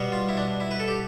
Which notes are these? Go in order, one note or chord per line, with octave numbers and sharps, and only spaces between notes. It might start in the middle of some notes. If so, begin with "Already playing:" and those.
Already playing: B2 G3 B3
F4
E4
D4
E4
B4
A4
G4